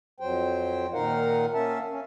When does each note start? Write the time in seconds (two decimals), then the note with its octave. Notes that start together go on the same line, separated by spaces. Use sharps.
0.20 F2 F#3 C5 G5
0.93 A#2 D#3 D#4 A#4 F5 F#5
1.54 A#3 C#4 E5 A5
1.90 C#4